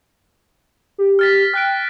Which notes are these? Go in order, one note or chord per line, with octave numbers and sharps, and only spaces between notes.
G4
F6 A6 B6
G5 F6 F#6 D7